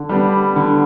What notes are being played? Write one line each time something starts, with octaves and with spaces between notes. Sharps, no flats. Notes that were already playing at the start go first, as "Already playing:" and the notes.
Already playing: D3
G3 B3 D4
D3